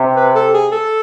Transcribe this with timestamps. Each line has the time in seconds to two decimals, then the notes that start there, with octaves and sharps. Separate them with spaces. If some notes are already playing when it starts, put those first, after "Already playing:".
Already playing: C3
0.16 B4
0.34 A4
0.54 G#4
0.72 A4